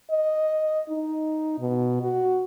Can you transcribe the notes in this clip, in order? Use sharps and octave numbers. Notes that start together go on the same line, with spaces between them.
D#5
D#4
B2
F#4